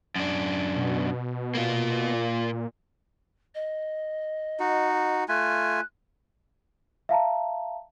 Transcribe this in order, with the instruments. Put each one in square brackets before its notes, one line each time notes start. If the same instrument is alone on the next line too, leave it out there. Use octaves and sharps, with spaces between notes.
[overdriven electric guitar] F#2 D4
[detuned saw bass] B2
[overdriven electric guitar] A#3 F4
[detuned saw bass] A#2
[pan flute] D#5
[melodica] D#4 F#4
[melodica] A3 F4 G#5 [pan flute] F#6
[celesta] E5 F5 A5 A#5